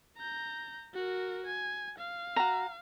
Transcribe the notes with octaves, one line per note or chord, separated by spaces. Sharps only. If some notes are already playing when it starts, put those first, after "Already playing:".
A#5 G6
F#4 A#4
G#5
F5
F#4 A#5